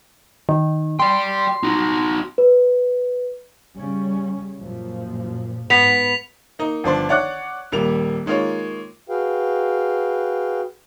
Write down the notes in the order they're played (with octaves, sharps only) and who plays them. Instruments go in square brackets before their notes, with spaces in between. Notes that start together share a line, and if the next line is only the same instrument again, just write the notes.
[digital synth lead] D#3
[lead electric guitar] D5 G5 [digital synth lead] C6
[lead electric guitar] D#4 F#4
[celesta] B4
[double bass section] C#3 G3 C#4
F#2 A#2 F3
[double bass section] G#2 [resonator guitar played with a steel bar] B3 [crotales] B6 F7
[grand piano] A#3 D#4
G1 F3 D4 C6
C#5 D5 F#5 C#6 D6 F#6
D#1 G3 A#3 F7
D#3 G#3 A#3 F4 C#5
[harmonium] F#4 G#4 B4 F5 G5